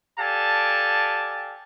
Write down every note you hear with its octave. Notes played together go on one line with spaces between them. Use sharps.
G4 A4 D5 F5 G#5 A5